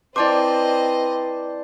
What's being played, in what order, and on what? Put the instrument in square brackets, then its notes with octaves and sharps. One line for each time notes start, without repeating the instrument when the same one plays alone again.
[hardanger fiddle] C4 D#5 [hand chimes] E4 A5 D6 [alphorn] B4 [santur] C5 D5